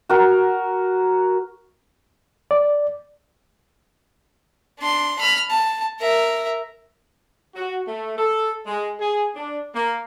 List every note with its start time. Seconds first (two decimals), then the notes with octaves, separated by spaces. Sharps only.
0.09 F#4 A#4
2.51 D5
4.79 D4 C6
5.19 B5 F6
5.50 A5
6.00 A#4 E5
7.55 F#4
7.87 A3
8.18 A4
8.66 G#3
9.00 G#4
9.35 D4
9.75 A#3